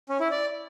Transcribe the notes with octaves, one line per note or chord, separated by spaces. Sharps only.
C#4
E4
D5